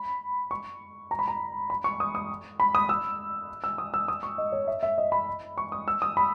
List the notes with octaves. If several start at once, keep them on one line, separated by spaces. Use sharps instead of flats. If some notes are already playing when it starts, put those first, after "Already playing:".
Already playing: B5
C#6
A#5
B5
A#5
B5
C#6
D#6
D#6
B5
D#6
E6
E6
D#6
E6
D#6
C#6
D#5
C#5
E5
E5
D#5
B5
C#6
D#6
E6
D#6
B5